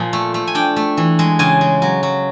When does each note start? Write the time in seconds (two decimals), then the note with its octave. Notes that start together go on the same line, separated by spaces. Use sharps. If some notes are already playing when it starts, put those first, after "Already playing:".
Already playing: A#2 F3 G#5
0.13 A3
0.34 A3
0.47 G#5
0.55 D4 G5
0.76 A3
0.97 E3
1.19 G#3
1.39 C#3 G#5
1.61 G#3
1.82 F#3
2.03 F#3